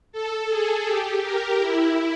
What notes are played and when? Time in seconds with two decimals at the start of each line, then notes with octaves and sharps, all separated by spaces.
0.12 A4
0.49 G#4
0.85 G4
1.22 A#4
1.59 E4